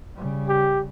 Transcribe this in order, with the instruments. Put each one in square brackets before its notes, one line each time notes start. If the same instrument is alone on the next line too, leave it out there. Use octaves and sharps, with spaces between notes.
[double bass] C#3 G3
[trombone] G4